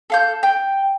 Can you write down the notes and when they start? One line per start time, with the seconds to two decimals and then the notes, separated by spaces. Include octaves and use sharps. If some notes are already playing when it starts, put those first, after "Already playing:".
0.10 A4 F5 G6
0.43 G5